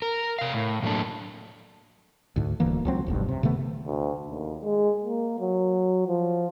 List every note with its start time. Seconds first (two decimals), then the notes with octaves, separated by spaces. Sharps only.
0.02 A#4
0.39 C3 F5
0.53 A2
0.83 A2 F#3 A#3 D4 A4
2.36 D2 G#2
2.60 D#1 D2 E3 A#3
2.85 C#2 F#3 C4
3.06 F1 B1 G2
3.28 C3
3.43 C3 D#3 A3 B3
3.86 D2
4.28 D#2
4.63 G#3
5.04 A#3
5.39 F#3
6.07 F3